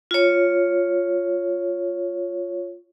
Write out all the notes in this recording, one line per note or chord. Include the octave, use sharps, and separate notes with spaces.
F4 C#5